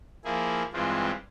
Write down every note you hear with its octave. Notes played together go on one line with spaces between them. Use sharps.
F3 A#3 E4 G#4
G2 E3 G#3 C4 F4